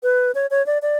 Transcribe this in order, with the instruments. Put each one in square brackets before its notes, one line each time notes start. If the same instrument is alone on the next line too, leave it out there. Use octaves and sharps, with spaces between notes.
[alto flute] B4
C#5
C#5
D5
D5